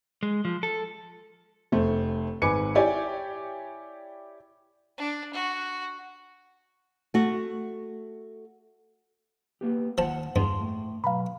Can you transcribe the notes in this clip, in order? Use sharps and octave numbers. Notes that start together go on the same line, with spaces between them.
G#3
F3
A4
F1 A3 C5
G#1 B4 G#5 D6 C#7
E4 G4 C#5 D5 G5 G#5
D4
F#4
A3 F#4
A#3 B3 G4
D#2 F3 F#5 A5
E2 G2 F5 A5 C6
A2
B2 F#3 F5 A#5 B5